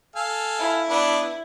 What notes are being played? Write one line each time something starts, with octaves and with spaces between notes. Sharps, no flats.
A4 F5 G#5
E4
B3 D4 B4